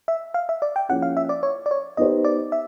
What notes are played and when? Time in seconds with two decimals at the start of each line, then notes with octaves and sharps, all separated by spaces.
0.08 E5
0.34 F5
0.49 E5
0.62 D5
0.76 G5
0.89 F3 A#3 C#4 E4 G#4 F#5
1.02 F5
1.17 E5
1.29 D5
1.43 C#5
1.66 D5
1.71 C#5
1.97 B3 D#4 G4 C5 D#5
2.24 D5
2.52 E5